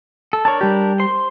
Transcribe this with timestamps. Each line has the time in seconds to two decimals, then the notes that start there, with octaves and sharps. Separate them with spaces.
0.33 A4
0.45 D4 A#4 C#5 A5
0.61 G3 G4
0.99 C5 C6